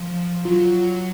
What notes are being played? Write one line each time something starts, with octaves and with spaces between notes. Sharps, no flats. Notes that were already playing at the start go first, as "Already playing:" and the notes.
Already playing: F3
F#3 F4